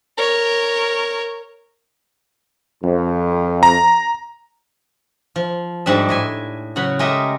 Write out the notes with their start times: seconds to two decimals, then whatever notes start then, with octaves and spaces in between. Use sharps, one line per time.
0.17 A#4 C#5
2.84 F2
3.63 A#5
5.36 F3
5.86 G#2 F3 G3 A3 D4 E5
6.09 A2 E5 G#5
6.76 C#3 F#3 F#5 B5
6.99 G#3 A3 G4 A#4 D#5 E5